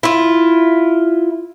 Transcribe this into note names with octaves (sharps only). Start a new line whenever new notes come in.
E4 F4